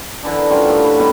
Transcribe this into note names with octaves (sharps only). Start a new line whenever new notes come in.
D3 E3 D4
A#4
D3 G3 C#4 F4
A2 G5 A5
B4
B2 G3 B3